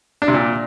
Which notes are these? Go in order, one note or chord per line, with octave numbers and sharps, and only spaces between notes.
D4
C3
A#2